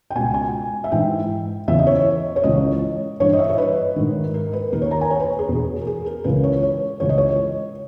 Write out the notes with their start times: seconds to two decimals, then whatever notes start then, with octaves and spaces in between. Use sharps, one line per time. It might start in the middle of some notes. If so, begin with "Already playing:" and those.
0.10 G5
0.15 C#2 B2 G#5
0.34 G#5
0.84 E5
0.92 G#2 E3 G5
1.68 E2 C#3 E3 E5
1.79 D#5
1.87 C#5
2.36 C#5
2.44 C#2 C#3 E3 D#5
3.20 G2 E3 C#5
3.33 D#5
3.39 E5
3.44 D#5
3.49 C#5
3.58 B4
3.96 G#2 D#3
4.34 A#4
4.53 B4
4.72 D#2 D#3 A#4
4.82 C#5
4.91 A#5
5.01 G#5
5.10 C#5
5.20 B4
5.39 G#4
5.49 E2 B2
5.81 A#4
5.87 G#4
6.06 A#4
6.24 C#2 C#3 E3 B4
6.44 C#5
6.63 C#5
7.00 C#2 C#3 E3 C#5
7.09 D#5
7.18 C#5